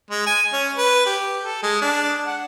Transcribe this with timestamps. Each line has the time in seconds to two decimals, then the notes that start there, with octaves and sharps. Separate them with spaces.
0.10 G#3
0.26 G#5
0.53 C#4
0.77 B4
1.06 G4
1.43 A4
1.63 G#3
1.81 D4
2.27 F#5